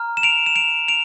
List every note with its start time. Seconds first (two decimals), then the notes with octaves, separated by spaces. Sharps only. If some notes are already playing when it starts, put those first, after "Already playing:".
Already playing: A#5 F6
0.17 E7
0.23 D7 F7
0.46 E7
0.56 D7 F7
0.88 D7 F7